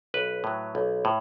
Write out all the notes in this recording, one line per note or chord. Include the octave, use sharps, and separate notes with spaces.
B1 B4
A2 F#3
B1
A2